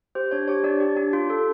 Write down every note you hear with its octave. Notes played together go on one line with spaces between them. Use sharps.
G4 C5
D4 C#5
G4 C#5
D4 D5
G4
D4
F4
A4